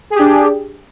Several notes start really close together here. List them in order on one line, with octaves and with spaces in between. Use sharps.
G#4 G4 D4